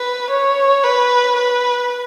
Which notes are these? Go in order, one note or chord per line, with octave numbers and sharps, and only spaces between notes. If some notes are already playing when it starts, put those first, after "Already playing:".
Already playing: B4
C#5
B4
B4